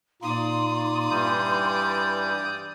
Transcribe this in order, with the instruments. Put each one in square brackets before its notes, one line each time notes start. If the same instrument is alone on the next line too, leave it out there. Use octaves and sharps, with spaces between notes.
[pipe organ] A#2 A#3 D#4 [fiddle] D5 D#6 [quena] C6
[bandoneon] G2 E3 G3 [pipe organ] G6